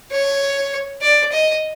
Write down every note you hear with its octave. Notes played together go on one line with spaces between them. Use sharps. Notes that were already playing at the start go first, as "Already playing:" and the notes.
C#5
D5
D#5